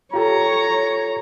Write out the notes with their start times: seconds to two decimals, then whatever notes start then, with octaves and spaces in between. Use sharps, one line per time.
0.14 F4 G4 A4 C#5 A#5